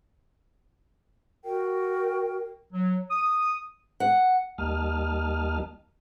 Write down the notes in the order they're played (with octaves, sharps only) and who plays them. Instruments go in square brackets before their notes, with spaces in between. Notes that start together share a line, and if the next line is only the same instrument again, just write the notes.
[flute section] F#4 G5 [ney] A#4
[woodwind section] F#3
D#6
[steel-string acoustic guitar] F#5
[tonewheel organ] D#2 G3 A#3 D#5 A5 F6